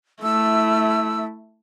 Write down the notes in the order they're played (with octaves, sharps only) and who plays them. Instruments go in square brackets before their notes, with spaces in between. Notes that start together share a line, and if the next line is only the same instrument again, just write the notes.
[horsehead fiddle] A3 E4 [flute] E6